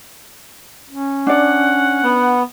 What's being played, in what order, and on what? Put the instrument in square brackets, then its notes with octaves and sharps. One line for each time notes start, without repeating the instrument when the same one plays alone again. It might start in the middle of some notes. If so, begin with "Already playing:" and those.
[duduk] C#4
[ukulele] D4 D5 [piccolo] F#5
[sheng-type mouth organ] B3